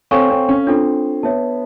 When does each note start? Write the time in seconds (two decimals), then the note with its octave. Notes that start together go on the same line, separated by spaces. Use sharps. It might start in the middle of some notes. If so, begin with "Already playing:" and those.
0.11 C4 A4 C#5 F5 G#5 C#6
0.30 C4
0.49 C#4
0.67 C4 D4 F4 A4
1.23 B3 C#5 E5 A5